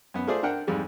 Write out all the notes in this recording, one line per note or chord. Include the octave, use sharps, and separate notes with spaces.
F#2 B3
A3 F4 G#4 C5 D5
D4 A#4 F#5 G5
F2 G#2 G3 G#3